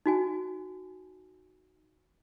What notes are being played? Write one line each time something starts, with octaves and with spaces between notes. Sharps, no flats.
D#4 F#4 G#5